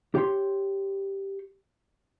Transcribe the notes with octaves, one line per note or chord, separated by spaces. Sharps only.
G4 C#5 C6